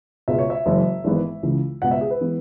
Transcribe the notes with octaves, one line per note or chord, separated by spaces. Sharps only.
C#2 B2 G#3 B3 E5
C#5
E5
F#1 F#2 E3 G#3
G#1 G#2 E3 G#3 B3
C#2 C#3 E3
C#2 B2 B3 F#5
E5
G#4
B4
E3 G#3 B3